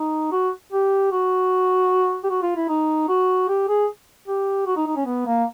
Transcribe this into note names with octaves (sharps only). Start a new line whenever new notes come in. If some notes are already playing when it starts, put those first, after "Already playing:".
Already playing: D#4
F#4
G4
F#4
G4
F#4
F4
E4
D#4
F#4
G4
G#4
G4
F#4
D#4
D#4
C#4
B3
A#3